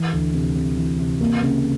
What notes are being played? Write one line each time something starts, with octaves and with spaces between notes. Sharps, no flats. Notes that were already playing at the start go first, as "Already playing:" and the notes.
Already playing: E3
D2
C3
C3
E3
C3
A#3
C#3